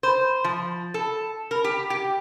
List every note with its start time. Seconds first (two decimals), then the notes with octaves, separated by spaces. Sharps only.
0.03 C5
0.44 F3
0.94 A4
1.51 A#4
1.64 G4
1.90 G4